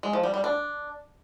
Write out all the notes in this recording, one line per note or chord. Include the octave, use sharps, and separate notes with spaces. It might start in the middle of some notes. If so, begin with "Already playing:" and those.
G#3
F3
G3
G3
D4